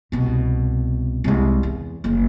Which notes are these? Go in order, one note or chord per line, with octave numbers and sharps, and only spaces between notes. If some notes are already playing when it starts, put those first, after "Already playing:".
C2 B2
C2 G#3
E2
F#1 D2